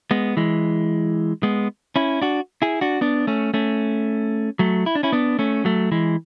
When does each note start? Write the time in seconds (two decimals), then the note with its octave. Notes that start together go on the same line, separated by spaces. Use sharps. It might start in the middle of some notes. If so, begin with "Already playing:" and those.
0.11 G#3 B3
0.37 E3 G#3
1.43 G#3 B3
1.96 C#4 E4
2.21 D4 F#4
2.62 E4 G#4
2.81 D4 F#4
3.01 B3 D4
3.27 A3 C#4
3.54 A3 C#4
4.59 F#3 A3
4.86 E4
4.95 D4
5.03 C#4 E4
5.12 B3 D4
5.39 A3 C#4
5.65 F#3 A3
5.92 E3 G#3